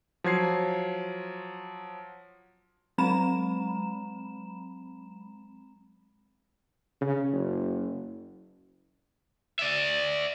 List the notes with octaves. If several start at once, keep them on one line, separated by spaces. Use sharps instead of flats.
F3 F#3 G#6 C7
F#3 G#3 C4 A#5 B5 E7
C#3
F#1
D5 E5